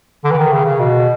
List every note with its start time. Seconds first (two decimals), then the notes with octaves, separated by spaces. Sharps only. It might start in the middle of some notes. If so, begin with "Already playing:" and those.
0.24 D3
0.31 E3
0.38 D#3
0.52 C#3
0.66 C#3
0.79 B2